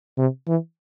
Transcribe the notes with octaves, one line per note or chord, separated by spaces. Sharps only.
C3
E3